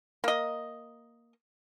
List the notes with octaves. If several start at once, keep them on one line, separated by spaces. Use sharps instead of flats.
A#3 D#5